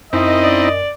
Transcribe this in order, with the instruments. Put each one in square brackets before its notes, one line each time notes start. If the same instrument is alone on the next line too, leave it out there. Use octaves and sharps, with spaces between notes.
[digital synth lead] F#2 [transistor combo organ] C4 D#4 E4 [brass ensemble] D#5
[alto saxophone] D5